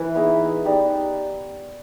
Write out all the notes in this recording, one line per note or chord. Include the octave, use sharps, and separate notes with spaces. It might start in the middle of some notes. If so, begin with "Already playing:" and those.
Already playing: E3
B3 D#4 G#4
D#4 G4 B4 D5